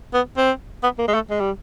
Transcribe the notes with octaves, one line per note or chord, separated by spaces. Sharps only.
B3
C4
B3
A#3
G#3
A3
G#3
G3